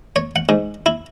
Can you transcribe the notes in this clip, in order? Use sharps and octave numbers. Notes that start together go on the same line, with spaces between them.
C#5
F#5
G#2
E4